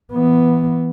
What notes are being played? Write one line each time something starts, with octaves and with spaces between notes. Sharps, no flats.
E3 B3